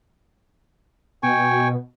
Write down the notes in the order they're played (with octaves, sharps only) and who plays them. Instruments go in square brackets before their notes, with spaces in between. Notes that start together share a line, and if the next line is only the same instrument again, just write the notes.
[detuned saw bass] B2 [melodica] G5 G#5 C#6